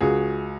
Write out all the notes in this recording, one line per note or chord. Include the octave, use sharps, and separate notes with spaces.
C#2 F#4 G#4